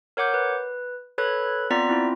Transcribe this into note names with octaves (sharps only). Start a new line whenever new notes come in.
A#4 C#5 F#5 D6 G6
B4
A4 B4 C#5 B5 F#6 G#6
B3 C4 F4 D5 A#5 B6
C4 E4 F4